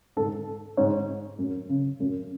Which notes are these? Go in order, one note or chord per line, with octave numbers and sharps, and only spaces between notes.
G#2 A4
G#2 C#5
F#2
C#3
F#2